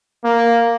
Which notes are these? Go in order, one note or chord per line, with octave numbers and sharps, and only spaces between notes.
A#3